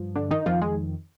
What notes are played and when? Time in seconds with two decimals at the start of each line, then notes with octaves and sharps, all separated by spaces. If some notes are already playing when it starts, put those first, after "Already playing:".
Already playing: G2 F3
0.16 D3 D4
0.31 D#3 D#4
0.46 F2 D#3 F3 F4
0.61 G#3 G#4